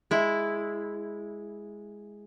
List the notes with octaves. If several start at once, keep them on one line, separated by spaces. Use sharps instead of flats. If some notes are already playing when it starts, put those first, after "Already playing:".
G#3 E4